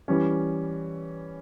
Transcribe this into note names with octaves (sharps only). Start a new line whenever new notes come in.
E3 G3 C#4